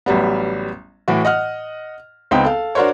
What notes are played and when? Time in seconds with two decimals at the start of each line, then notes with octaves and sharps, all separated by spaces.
0.06 A1 F#3 G3 B3
1.08 A2 E3 F#4
1.25 D#5 F#5 F6
2.31 C#2 B3 C4 D#4 G5
2.45 A4 F5
2.75 D4 F#4 A#4 C5 C#5